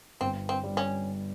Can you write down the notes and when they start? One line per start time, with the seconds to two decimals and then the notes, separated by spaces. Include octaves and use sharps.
0.20 G1 C4
0.49 C4
0.64 G3
0.77 C#4